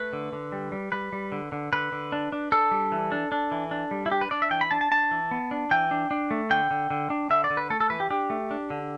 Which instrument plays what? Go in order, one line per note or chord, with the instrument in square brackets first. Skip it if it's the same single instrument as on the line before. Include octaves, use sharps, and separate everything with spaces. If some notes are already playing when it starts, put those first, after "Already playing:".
Already playing: [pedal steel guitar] A3 B4
D3
D3
G3
G3
G3 B4
G3
D3
D3
D3 B4
D3
D4
D4
D4 A4
G3
E3
D4
D4
E3
D4
G3
E4
D4 G4
B4
D4 D5
E5
E3 G5
B5
D4 A5
A5
D4 A5
E3
B3
D4
E3 G5
D4
D4
A3
D3 G5
D3
D3
D4
D3 E5
D5
D3
B4
A3 A4
A4
E3 B4
G4
D4 G4
A3
D4
D3